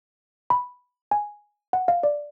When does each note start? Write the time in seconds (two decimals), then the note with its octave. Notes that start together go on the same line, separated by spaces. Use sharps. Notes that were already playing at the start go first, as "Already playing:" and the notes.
0.50 B5
1.11 G#5
1.73 F#5
1.88 F5
2.03 D5